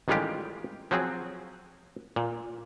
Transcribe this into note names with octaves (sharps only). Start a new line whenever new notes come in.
A1 D#3 G3 G#3 F4 G4
F3 F#3 C4 G#4
A#2